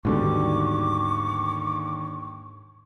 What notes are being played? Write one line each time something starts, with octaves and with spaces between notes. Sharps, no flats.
D#2 G#2 B2 D3 G3 C#6 D6